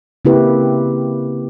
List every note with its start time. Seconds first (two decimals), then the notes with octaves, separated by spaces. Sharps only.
0.25 C#3 A#3 C4 E4 G4 B4